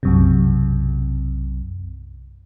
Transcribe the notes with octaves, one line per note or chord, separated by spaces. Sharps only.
B1 F#2 C3